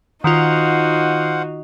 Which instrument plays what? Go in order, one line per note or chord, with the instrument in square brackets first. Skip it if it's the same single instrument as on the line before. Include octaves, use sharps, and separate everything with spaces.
[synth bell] D#3 F4 [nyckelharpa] D#4 F#4 [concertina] C5 F5 F#5